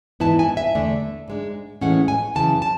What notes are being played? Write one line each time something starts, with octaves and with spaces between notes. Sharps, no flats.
G#2 E3 B3 E4 A5
G#5
E5
E2 D3 A3 D4
G#2 G#3 D4
A2 E3 G#3 C#4 F#5
G#5
F#2 C#3 E3 A5
A5